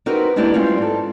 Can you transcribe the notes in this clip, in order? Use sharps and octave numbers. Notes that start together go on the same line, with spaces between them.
C4 D#4 F#4 G4 A#4 B4
G#3 A#3 B3 D4 E4 G4
G3 G#3 C4 C#4 F4
G#2 A4